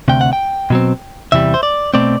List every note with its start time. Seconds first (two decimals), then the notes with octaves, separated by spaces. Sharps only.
0.08 D2 C3 G5
0.21 F#5
0.33 G5
0.70 B2 F#3 C4
1.32 E2 C3 E3 G3 E5
1.54 C5
1.63 D5
1.94 B2 A3 C4 D5